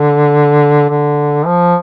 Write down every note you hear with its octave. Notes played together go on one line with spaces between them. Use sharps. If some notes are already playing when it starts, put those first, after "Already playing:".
Already playing: D3
D3
F3